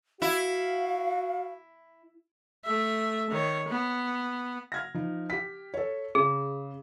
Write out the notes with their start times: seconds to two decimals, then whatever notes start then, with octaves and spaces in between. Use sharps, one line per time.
0.22 E4 F#4 F5
2.65 A3 E5
3.30 D#3 C#5
3.68 B3
4.72 F6 G#6 A#6
4.94 F3 D#4
5.30 G4 B6
5.74 A4 C#5
6.15 C#3 G#4